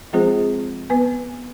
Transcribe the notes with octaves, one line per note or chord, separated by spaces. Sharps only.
F3 G#3 C4 F4 G#4 C5
B3 B4 G#5